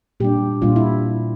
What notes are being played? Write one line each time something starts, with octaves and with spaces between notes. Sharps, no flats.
A#2 G3 D4 G4
A#2 G3 D4 F4
E4